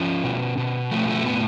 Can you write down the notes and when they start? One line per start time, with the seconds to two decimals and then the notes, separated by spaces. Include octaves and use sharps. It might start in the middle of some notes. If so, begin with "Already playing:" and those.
Already playing: F3 C#4
0.24 B2
0.58 B2
0.91 F3 A3
1.08 A3
1.24 A2 B3